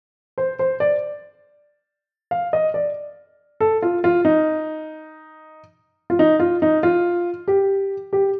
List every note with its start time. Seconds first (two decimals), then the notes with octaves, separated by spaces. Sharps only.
0.38 C5
0.59 C5
0.80 D5
2.31 F5
2.53 D#5
2.74 D5
3.60 A4
3.82 F4
4.04 F4
4.25 D#4
6.10 F4
6.19 D#4
6.40 F4
6.62 D#4
6.83 F4
7.48 G4
8.13 G4